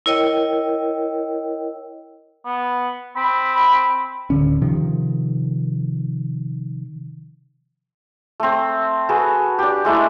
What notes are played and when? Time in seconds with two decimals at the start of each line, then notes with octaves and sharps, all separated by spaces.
0.06 E4 A#4 C#5 D#5 G5
2.45 B3
3.16 C4 B5
4.30 D1 D3 C#4
4.62 C3 D#3 F3
8.40 A3 C4
9.09 F#4 G#4 A4 B4
9.58 D4 G4
9.85 G#3 A3 E4